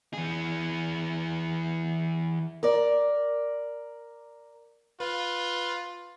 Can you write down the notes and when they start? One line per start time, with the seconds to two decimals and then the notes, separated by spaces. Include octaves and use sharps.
0.13 E3 G#4
2.63 A#4 D5
5.00 F4 B4